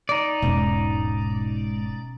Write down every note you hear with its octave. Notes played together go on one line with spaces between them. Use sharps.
D#4 D5
E1 G#2 B2 C#4